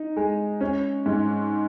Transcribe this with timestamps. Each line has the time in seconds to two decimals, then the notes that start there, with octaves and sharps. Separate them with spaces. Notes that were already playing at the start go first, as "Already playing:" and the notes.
Already playing: D#4
0.16 G#3
0.61 C#4
1.06 G#2